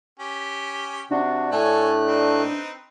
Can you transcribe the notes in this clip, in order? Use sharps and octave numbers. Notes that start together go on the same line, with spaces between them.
C#4 G4
C3 D4 F#4
A2 A3 A4 C#5 G#5 F#6
C4 D#4 B4